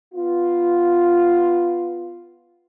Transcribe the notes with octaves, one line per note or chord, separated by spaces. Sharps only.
B3 F4